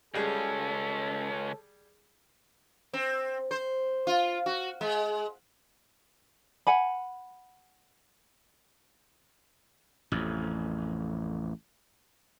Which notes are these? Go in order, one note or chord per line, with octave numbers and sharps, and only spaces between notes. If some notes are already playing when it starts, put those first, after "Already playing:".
C#2 G3 C#4 G#4 A4
C4
C5
F4
F#4
G#3
F#5 G#5 B5
A1 F2